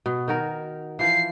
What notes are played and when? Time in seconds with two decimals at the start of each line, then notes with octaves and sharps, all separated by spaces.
0.06 B2
0.28 D#3 F#4 A#4
0.99 E3 F3 C7